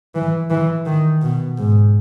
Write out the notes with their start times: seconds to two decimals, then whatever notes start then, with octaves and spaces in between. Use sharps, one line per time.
0.15 E3
0.51 E3
0.86 D#3
1.22 B2
1.58 G#2